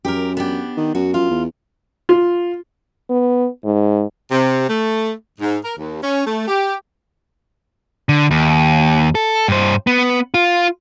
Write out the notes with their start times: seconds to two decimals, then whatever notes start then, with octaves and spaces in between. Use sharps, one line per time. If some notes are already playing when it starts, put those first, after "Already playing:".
0.05 F#2 G4 A#4
0.37 B3 D4 G4
0.77 D#3
0.95 F#2 F#4
1.14 F4
1.30 E2
2.09 F4
3.10 B3
3.64 G#2
4.31 C3
4.68 A3
5.40 G#2
5.64 A#4
5.78 D#2
6.02 C#4
6.26 A3
6.48 G4
8.09 D3
8.31 D#2
9.15 A4
9.48 G2 C5
9.87 B3
10.34 F4